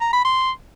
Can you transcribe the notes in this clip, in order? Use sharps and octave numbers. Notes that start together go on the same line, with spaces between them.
A#5
B5
C6